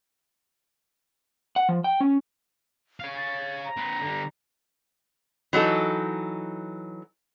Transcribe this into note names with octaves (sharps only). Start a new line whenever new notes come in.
F#5
F3
G5
C#4
C#5 F5
A6
A#5
C4 B4
D3 G3
E3 F#3 D#4 A4